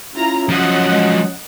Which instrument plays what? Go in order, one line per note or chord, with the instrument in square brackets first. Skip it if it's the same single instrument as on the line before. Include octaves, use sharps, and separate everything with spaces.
[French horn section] C#4 [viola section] E4 F4 A#5
[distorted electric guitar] F3 F#3 [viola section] D#5 F#5
[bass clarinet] G#3